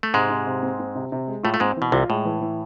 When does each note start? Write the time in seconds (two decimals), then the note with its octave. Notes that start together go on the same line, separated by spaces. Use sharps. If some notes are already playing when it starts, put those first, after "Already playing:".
0.03 A3
0.14 G#2 C3 G#3
0.30 C3
0.47 C3
0.63 C4
0.80 C4
0.95 C3
1.12 C3
1.27 G#3
1.43 A2 A3 F4
1.54 A3
1.60 G#2 G#3 C4
1.77 E3
1.82 B2
1.92 C2 C3 F4
2.09 A2 G#3
2.25 E3
2.41 E3